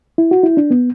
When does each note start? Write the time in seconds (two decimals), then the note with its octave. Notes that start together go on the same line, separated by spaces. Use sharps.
0.18 E4
0.31 F#4
0.43 E4
0.57 D4
0.70 B3